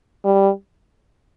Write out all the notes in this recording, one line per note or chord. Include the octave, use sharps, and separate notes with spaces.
G3